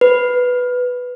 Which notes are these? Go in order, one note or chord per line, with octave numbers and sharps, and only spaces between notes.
B4